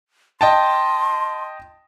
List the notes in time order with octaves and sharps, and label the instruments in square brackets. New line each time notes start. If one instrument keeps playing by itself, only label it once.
[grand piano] D#5 G5 A5 [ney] C6